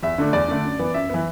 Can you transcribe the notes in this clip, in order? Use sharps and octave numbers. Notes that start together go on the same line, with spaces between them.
E2 E5
D3 A3 D4
E2 D5
D3 A3 D4
F#2
E3 B3
F#2 E5
E3 B3